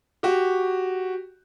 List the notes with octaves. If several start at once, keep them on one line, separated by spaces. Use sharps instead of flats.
F#4 G4